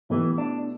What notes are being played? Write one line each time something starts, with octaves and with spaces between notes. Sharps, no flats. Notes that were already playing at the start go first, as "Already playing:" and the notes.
B2 E3 A3 E4 G4
D4